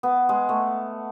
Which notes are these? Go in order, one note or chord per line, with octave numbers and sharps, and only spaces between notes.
B3
G#3
A3